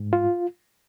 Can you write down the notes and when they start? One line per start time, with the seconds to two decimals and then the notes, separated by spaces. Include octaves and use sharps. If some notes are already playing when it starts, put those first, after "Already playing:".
Already playing: G#2
0.13 F4